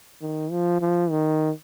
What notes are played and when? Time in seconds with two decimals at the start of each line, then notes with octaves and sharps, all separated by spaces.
0.22 D#3
0.51 F3
0.81 F3
1.11 D#3